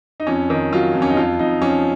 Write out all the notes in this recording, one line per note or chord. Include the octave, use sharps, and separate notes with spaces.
D#4
F2 C#4
D#3
F#3 F4
F2
C#4
D#4
F2 F4
F2 D#4
F3 C#4